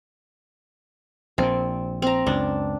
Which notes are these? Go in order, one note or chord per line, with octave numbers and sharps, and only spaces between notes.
A#1 A#2 C4
C4 A#5
C#2 F#2 D4